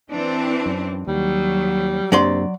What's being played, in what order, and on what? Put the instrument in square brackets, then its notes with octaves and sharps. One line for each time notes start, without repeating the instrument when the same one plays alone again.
[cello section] E3 C4 D4
[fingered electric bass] F#2
[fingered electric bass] D#2 [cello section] F#3 [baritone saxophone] G3
[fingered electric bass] F#2 A#3 D4 [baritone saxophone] C3 [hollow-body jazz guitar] F#3 D5 C6